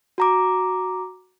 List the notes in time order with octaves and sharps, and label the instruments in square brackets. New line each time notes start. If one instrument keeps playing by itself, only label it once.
[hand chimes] F#4 A#5 D6